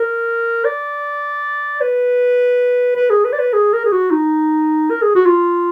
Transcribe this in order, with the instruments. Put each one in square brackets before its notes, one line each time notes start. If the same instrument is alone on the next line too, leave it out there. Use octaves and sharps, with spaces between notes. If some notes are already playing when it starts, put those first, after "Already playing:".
Already playing: [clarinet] A#4
D5
B4
B4
G#4
B4
D5
B4
G#4
A#4
G#4
F#4
D#4
A#4
G#4
F#4
F4